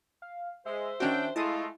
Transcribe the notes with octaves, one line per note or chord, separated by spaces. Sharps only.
F5
G#3 C5 E5
D#3 C#4 D4 F#4 G5
G#3 A3 E4 F4 D#5 A5 D#6